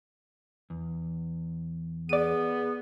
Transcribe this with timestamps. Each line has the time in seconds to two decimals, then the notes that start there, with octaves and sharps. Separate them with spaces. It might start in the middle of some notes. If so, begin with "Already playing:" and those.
0.70 E2
2.09 B3 G#4 D5 D#7